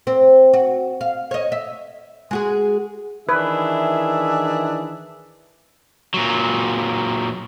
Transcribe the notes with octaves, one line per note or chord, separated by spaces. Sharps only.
C4
F#4
F5
C#5 D#5
E5
G#3 F#4 G#4
D#3 E3 D4 E4 G#4 B4 E5
A#2 F#3